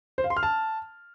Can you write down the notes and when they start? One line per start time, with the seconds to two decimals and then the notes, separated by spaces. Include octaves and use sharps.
0.18 C5
0.24 F5
0.30 C6
0.37 F6
0.43 A5